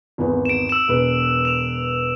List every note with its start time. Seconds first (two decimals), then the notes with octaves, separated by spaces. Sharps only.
0.18 G#1 E2 B3
0.45 D7 E7
0.69 E6 E7
0.88 E1 B4
1.45 E7 F7